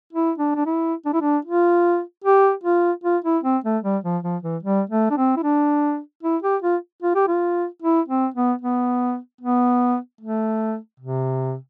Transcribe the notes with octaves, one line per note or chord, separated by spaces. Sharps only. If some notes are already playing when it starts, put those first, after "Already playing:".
E4
D4
D4
E4
D4
E4
D4
F4
G4
F4
F4
E4
C4
A3
G3
F3
F3
E3
G3
A3
D4
C4
E4
D4
E4
G4
F4
F4
G4
F4
E4
C4
B3
B3
B3
A3
C3